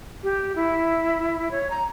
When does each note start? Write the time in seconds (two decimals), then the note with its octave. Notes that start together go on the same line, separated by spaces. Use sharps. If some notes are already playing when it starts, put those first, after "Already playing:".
0.23 G4
0.56 E4
1.51 C#5
1.70 A#5